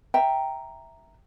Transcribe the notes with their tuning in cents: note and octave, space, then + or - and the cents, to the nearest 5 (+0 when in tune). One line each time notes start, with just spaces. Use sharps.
E5 +0 G5 +0 A#5 +0